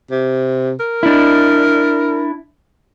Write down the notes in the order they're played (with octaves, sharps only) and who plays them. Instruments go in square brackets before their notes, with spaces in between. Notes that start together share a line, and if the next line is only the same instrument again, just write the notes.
[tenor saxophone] C3
A#4
[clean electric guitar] D4 E4